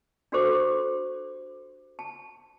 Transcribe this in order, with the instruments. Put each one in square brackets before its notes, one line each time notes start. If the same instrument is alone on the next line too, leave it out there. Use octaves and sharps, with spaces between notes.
[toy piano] D4 F#4 G4 A4 C5 D6
A5